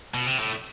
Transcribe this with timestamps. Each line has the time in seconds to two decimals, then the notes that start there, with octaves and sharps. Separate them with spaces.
0.14 B2
0.27 C3
0.39 A2